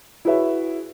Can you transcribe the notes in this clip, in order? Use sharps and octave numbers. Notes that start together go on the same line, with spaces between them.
E4 F#4 G#4 B4 C#5 E5